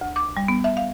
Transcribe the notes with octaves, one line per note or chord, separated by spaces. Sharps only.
D2
D6
G3
B3
E5
F5